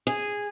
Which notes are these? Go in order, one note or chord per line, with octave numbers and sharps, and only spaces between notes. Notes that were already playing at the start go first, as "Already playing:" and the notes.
G#4